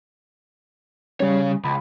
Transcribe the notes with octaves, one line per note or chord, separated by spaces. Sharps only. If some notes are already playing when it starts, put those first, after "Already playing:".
C#3 G3 C#4 C#5
C#2 B5